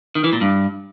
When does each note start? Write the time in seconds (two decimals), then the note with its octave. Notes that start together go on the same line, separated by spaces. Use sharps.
0.15 D#3
0.24 E3
0.33 A#2
0.41 G2